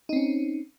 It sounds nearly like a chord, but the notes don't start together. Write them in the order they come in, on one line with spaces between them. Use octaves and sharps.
D#4 C4 C#4